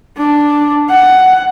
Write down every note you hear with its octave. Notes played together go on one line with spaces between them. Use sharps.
D4
F#5